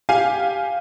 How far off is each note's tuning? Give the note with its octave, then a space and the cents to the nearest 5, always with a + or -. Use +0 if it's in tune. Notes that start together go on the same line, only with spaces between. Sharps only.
G4 +0 F5 +0 G#5 +0